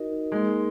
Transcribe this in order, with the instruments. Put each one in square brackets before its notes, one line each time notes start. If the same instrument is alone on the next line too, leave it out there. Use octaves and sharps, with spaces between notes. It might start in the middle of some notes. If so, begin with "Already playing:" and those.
Already playing: [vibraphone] D#4 F#4 A#4 D#5
[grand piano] G#3 [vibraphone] A#3 D#4 A#4